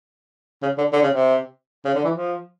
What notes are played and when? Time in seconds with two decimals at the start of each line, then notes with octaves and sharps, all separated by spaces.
0.62 C#3
0.78 D3
0.93 D3
1.03 C#3
1.13 C3
1.85 C#3
1.95 D3
2.05 E3
2.16 F3